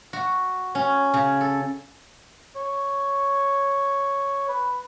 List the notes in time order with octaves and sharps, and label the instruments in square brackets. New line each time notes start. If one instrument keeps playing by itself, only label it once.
[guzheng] F#4
C#4
C#3
A4
[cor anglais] C#5
B4